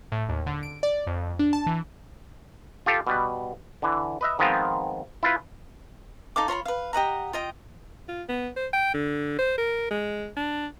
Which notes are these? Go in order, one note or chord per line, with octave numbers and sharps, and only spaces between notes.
A2
D#2
D3
D7
D5
F2
D4
A5
E3
F4 G4 A4 F5
B2 G3 B4
D3 E3
B4 D#5 E5
D#3 F3 G#3 B3 C4 F4
E4 F4 B4
D#4 A4 F5 D6
F4 C#5 A#5 B5
B4 F5
G4 D#5 F#5 A#5
F4 D#5 G5
F4
B3
C5
G5
D3
C5
A#4
G#3
D4